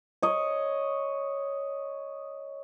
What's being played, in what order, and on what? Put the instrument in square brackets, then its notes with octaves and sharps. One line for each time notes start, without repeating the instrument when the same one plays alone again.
[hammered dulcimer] C#5 D#5